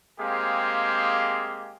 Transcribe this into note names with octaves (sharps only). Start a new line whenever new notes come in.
G#3 A#3 C4 G4 G#4 F5